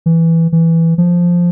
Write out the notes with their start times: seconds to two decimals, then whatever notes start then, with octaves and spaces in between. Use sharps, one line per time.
0.06 E3
0.52 E3
0.98 F3